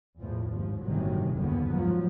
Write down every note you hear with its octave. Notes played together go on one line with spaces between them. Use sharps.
E2 A2 F3
G#1 D#2 F3
G1 A2 C3 D#3 F#3
F#1 D#2 D3 D#3 B3
G#2 F3 F#3